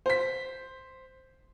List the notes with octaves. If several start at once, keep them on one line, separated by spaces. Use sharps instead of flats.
C5 B6